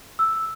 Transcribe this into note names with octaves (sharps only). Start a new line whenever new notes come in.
E6